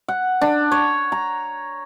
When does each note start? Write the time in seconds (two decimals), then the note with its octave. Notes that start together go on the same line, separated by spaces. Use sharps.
0.08 F#5
0.41 D4
0.72 C#5
1.12 A#5